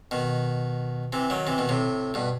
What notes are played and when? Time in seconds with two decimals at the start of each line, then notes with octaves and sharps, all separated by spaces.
0.11 B2 D#3
1.13 C3 E3
1.30 D#3 F#3
1.47 C3 E3
1.58 B2 D#3
1.69 A2 C3
2.14 G2 B2